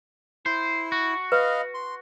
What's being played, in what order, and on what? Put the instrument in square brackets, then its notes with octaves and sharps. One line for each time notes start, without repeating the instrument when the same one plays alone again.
[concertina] E4 [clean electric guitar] C5
[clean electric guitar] F#4
[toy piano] B4 [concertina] D#5 F5 B5
[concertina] C6